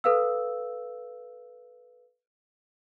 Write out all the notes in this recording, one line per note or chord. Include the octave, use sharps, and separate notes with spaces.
A4 B4 F5 E6